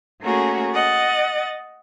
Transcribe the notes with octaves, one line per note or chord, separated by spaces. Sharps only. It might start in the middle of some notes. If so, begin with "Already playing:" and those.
A3 A#3 C#4 F#4 G#4 A#4
D#5 F#5 A6